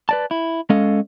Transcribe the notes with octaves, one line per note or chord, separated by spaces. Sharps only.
B4 D5 A5
E4
G#3 C#4 A4 D#5 F5